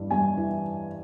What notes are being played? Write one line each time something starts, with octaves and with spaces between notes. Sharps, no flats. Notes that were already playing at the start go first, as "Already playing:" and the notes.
Already playing: G2 E3 G3
G2 G#5
E3